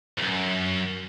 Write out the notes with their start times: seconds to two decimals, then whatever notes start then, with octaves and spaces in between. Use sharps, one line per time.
0.19 B1 F#2